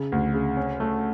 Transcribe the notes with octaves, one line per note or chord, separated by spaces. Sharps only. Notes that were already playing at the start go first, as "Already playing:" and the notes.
Already playing: C#3
D2
C#3
C#4
A3